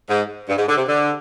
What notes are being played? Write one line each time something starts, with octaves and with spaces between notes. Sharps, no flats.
G#2
G2
G#2
D3
C3
D3